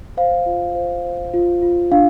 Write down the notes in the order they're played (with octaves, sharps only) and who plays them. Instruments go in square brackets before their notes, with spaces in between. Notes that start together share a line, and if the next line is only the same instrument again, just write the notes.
[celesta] C5 F5
F4
C5
C5
F4
F4
D4 F5